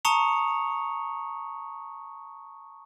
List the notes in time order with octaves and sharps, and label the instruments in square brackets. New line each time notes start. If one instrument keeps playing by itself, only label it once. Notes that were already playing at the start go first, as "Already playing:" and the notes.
[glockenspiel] A5 A#5 C#6 D#6 C#7 F7